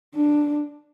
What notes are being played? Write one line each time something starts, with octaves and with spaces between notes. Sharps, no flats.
D4